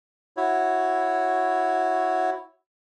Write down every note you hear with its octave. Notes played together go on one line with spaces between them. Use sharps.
E4 F#4 C#5